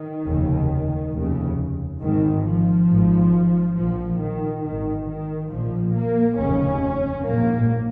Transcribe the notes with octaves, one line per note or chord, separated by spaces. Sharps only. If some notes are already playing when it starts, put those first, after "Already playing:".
Already playing: D#3
F1 D#2 C#3
F1 D#2 C#3
G#1 G#2 D#3
F3
G#1 G#2
A#1 A#2 F3
D#3
G#1 G#2 D#3
D#3
A#1 A#2 F3
A#3
F1 D#2 C#3 C#4
A#1 G#2 A#3